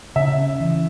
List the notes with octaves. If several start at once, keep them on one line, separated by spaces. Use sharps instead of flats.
C#3 E5
C#4
E3